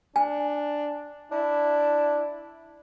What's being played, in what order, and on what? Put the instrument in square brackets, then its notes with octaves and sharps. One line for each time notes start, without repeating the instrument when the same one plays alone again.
[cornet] D4 [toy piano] G#5
[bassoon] D4 [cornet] E4